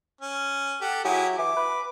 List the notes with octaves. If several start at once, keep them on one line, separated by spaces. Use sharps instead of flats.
C#4
G4 A4 F#5
F#3 E4 G4 G#4
E3 D6
B4